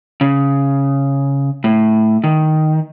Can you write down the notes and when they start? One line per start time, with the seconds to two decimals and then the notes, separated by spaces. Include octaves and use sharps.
0.21 C#3
1.64 A2
2.24 D#3